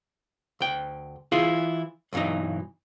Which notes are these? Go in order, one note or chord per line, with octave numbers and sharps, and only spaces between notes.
D2 G5
E3 E4 F4 G#4
B1 G2 E3 F#3 D#4